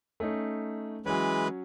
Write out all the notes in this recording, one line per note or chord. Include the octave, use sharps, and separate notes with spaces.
A3 C#4 D#4
E3 F#3 G#3 C#4 B4